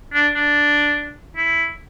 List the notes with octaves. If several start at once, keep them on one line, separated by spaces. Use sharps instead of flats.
D4
D4
E4